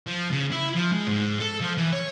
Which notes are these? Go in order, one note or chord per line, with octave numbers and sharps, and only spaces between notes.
F3
C#3
E4
F3
G#3
G#2
A4
F3
E3
C#5